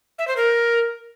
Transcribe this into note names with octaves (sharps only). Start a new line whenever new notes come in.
E5
C5
A#4